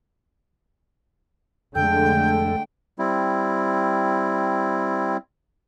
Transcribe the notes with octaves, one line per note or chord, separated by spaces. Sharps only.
F2 D3 G#3 A3 A4 G5 G6
G3 C4 E4